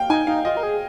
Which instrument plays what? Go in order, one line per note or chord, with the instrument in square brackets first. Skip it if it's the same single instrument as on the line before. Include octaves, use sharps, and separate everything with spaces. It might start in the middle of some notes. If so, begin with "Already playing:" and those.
Already playing: [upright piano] F5 G5
[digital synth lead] D#4 [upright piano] G#5
[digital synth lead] D#4 [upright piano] F5
[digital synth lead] F4 [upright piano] D#5
[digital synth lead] A#4
G#4